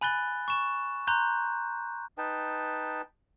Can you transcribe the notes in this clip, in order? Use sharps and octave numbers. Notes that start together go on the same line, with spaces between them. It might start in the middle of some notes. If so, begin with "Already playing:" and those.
G#5 B5 F#6 A6 G7
C#6 E7
A#5 C6 F#6 G6
D#4 B4 G5 A5